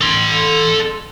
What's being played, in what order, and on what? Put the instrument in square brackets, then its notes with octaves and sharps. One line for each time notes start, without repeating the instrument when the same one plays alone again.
[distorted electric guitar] A4 C6